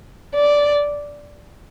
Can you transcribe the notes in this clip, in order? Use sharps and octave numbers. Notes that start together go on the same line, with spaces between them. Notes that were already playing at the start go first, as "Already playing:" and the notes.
D5